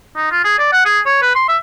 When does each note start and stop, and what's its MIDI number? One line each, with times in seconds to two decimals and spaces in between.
0.16 0.28 63
0.31 0.41 65
0.44 0.58 68
0.59 0.68 74
0.73 0.84 78
0.85 1.00 68
1.06 1.21 73
1.22 1.32 71
1.35 1.45 84
1.48 1.57 76